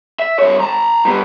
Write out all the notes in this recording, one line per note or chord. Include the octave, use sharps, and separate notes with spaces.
E5
G2 C#5
A5 A#5
G2 B3